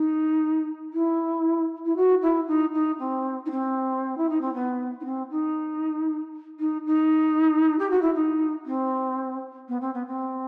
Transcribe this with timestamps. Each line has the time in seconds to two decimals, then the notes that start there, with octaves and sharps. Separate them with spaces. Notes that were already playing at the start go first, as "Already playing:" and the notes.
Already playing: D#4
0.93 E4
1.85 E4
1.97 F#4
2.22 E4
2.47 D#4
2.73 D#4
2.99 C4
3.46 D#4
3.51 C4
4.17 E4
4.29 D#4
4.41 C4
4.54 B3
5.00 D#4
5.05 C4
5.30 D#4
6.59 D#4
6.85 D#4
7.79 G4
7.90 F#4
8.02 E4
8.14 D#4
8.66 C4
9.68 B3
9.81 C4
9.94 B3
10.07 C4